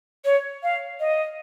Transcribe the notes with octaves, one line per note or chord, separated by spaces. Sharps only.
C#5
F5
D#5